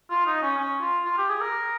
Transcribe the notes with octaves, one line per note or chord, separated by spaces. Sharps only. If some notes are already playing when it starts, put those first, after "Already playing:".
F4
D#4
C#4
C#4
F4
F4
G4
G#4
A#4